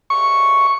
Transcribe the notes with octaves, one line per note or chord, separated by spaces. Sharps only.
C#6